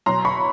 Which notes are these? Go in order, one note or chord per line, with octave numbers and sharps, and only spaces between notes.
B2 F#3 A#5 C6
B5 C#6